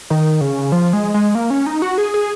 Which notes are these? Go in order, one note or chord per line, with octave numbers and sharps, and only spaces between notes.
D#3
C#3
F3
G#3
G#3
A#3
C#4
D#4
F#4
G#4
G#4